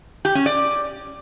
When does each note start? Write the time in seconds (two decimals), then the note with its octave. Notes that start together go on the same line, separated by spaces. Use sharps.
0.25 G4
0.35 C#4
0.46 D5